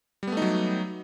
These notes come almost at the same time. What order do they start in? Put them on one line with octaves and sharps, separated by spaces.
G3 B3 A3 D#4 F#3